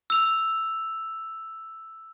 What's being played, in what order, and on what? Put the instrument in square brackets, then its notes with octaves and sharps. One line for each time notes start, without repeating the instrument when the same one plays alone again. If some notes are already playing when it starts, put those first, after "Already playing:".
[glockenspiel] E6 F7